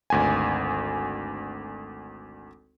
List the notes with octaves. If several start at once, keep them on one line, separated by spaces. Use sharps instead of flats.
G#1 D2 G#5